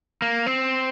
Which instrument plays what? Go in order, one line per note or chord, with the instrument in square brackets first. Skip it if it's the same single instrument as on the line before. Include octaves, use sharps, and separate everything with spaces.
[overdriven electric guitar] A#3
C4